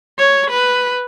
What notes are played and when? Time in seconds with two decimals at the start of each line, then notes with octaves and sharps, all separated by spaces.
0.18 C#5
0.50 B4